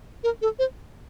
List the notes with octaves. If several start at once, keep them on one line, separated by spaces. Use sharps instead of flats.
A#4
A4
C5